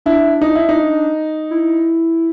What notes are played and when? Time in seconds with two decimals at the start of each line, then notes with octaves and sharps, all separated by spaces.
0.06 D4 E4
0.41 D#4
0.55 E4
0.69 D#4
1.51 E4